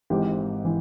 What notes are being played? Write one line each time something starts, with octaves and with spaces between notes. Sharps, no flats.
G#1 G#2 E3 G4
E3